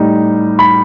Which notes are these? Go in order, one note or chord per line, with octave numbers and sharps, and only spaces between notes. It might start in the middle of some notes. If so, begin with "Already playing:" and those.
Already playing: A2 G3 D#4
B5